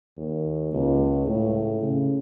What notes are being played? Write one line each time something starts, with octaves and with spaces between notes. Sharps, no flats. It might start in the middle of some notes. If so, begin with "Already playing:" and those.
D#2
C#2
A2
C#3